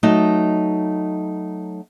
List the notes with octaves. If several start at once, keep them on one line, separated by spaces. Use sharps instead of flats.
F#3 A3 D#4 D#5 A5